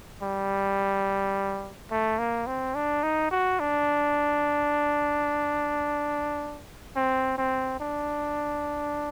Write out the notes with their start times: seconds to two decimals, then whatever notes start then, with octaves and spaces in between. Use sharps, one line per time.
0.22 G3
1.91 A3
2.19 A#3
2.47 C4
2.75 D4
3.03 D#4
3.31 F#4
3.59 D4
6.96 C4
7.38 C4
7.80 D4